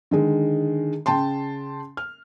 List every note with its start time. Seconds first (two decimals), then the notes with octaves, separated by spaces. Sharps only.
0.11 D3 D#3 G#3
1.06 C#3 G5 A5 C6
1.97 F6